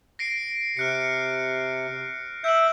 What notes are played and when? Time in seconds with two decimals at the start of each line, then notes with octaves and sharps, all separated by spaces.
0.19 A#6 C7 D7
0.77 C3 F6 F#6 C#7
2.44 E5 G6 D7 F#7